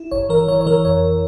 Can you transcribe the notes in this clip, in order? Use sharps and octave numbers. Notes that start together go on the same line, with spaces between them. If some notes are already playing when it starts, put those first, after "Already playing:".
Already playing: E4
G1 C#5
E3 A#4
E3 C#5
C#5
E3 A#4
F2 C#5